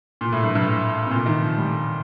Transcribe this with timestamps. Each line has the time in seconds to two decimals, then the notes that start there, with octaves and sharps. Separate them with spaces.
0.21 A#2
0.32 A2
0.44 G2
0.55 G2
0.66 A2
1.07 C3
1.11 A#2
1.26 D#3
1.41 F3
1.57 G3